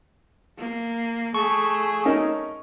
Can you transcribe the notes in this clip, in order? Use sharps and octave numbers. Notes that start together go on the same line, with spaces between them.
A#3
A3 G#4 C#6
C#4 D#4 A#4